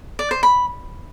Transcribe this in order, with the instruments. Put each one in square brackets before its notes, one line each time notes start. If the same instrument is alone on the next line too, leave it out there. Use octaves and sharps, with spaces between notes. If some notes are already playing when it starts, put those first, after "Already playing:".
[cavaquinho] D5
C5
B5